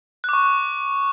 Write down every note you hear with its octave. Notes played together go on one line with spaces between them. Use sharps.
C#6 D6 F#6